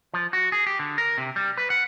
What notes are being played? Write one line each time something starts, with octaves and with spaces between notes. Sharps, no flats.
F3
F#4
G#4
G4
D3
A#4
C3
G3
B4
F#5